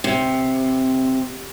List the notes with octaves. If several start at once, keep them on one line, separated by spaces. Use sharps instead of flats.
C3